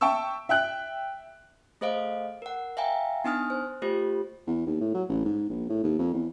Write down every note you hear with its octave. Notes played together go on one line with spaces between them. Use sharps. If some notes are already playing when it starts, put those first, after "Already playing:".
E5 G5 A5 C#6 E6
E5 G5 F#6
A3 G#4 C5 D#5 F5 D7
A#4 F#5
E5 F5 G5 G#5 A#5
B3 D4 D#4 G#5 D#6 F6
C5
A3 F4 G4 C5
E2
D#2
A2
F#3
A1
G#2
A#1
A2
D#2
F2
E2